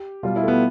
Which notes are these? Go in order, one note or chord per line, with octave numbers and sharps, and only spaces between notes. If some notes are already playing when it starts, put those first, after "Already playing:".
Already playing: G4
B2 G3 F4
E4
A3
B3